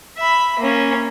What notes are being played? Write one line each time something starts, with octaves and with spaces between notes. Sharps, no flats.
E5 B5
A#3 C#4